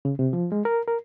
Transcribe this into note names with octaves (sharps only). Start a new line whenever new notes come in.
C#3
C3
F3
G#3
A#4
A#4